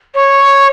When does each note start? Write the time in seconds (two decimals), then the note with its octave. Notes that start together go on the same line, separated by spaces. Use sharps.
0.14 C#5